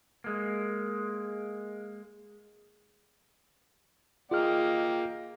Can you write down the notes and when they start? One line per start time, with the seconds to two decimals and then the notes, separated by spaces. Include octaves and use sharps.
0.24 G#3 A#3
4.31 A#3 F4 G#4 D#5 G5 F6